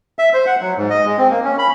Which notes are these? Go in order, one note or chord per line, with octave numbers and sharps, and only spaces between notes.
E5
C5
F#5
F#3
G#2
D#5
G#3
C4
A#3
C#4
B5